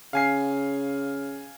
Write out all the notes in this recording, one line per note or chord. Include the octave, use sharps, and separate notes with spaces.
C#3 F5 G#5 C7